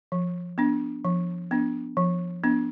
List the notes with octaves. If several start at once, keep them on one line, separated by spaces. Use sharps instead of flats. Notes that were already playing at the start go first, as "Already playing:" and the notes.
F3
B3 D4
F3
B3 D4
F3
B3 D4